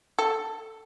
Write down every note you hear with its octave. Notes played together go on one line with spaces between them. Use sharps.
A4